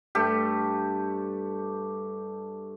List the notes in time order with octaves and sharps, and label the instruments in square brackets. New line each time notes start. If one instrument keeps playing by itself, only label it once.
[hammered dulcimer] G2 A3 G4